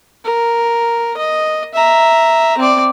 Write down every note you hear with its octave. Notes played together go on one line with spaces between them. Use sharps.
A#4
D#5
E5 A#5
C4 D5